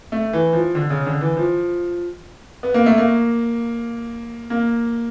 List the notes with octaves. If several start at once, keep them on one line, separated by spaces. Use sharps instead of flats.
A3
E3
F3
D3
C#3
D3
E3
F3
B3
A#3
A3
A#3
A#3